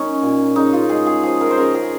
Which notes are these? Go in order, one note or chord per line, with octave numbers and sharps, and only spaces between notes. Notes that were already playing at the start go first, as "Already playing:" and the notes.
Already playing: F#3 A#3 C#4 D#4
A#2
C#3 D#4
F4
G#3 G#4
G#4
F3 G#4
A#4
C5
C#3 A#4
G#4